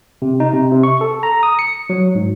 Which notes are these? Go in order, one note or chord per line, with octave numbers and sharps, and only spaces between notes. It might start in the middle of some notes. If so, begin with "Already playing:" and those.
C3
D#4
C3
C3
C#6
A4
A#5
D#6
C#7
F#3
G#2